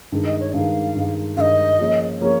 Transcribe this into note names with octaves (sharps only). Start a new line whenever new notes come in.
G2 D#3 G#3
D#5
C#5
G2 D#3 G#3 F5
G2 D#3 G#3
G2 D#3 G#3 D#5 F5
F3 A#3 C#4 G#4
F3 A#3 C#4 G#4 C#5